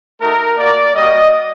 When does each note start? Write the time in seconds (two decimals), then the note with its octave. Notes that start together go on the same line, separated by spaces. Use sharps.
0.20 A3 D#4 F#4 A#4
0.58 A#3 F#4 D5
0.95 G3 A#3 F#4 D#5